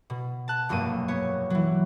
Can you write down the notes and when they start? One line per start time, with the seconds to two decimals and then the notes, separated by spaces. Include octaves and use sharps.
0.10 B2
0.48 A5 F#6
0.69 F1 B1 G2 A#3 D#7
1.08 B3 C#5
1.50 E3 F#3